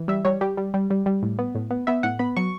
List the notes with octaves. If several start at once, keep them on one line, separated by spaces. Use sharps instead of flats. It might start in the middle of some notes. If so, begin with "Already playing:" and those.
Already playing: E3
G3 E5
G3 C#5
G3 G4
G3
G3
G3
G3
A2
B3
A2
B3
B3 E5
A2 F#5
B3 B5
F#3 C#6